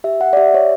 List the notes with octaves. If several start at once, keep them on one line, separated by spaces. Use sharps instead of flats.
G4 E5
G4 F#5
D5
G4 E5
G4 C#5